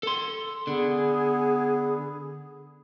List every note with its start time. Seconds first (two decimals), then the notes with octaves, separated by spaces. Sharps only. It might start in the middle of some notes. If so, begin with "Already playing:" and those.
0.03 A4 C6
0.67 D3 B3 G#4